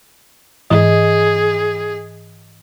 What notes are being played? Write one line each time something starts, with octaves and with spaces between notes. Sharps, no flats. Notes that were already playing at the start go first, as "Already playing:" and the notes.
G#2 E3 G#4 D#5